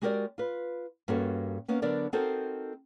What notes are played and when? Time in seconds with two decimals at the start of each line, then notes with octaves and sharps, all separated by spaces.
0.02 G#3 F#4 G4 A#4 C5 D5
0.38 F4 B4
1.08 G2 A#3 C#4 F#4 A4
1.68 A#3 B3 C#4
1.82 D3 F#3 B3 D4 A#4 D5
2.13 C4 D#4 F#4 A4 A#4 C5